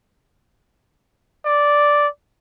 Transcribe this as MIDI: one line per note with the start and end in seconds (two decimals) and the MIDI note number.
1.46 2.07 74